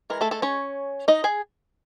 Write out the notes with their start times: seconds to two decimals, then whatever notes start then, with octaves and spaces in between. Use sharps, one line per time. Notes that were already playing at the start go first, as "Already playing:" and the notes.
0.10 E3 G#3 A#4
0.21 A3 A4
0.31 A3 A4
0.42 C#4 C#5
1.08 D#4 D#5
1.24 G#4 G#5